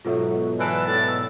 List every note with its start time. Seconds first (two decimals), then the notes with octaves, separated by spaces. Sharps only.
0.05 G#2 B2 F#3 F4 A4 E5
0.59 E3 D5 A5 F#6 D7
0.87 A2 A6
1.08 E6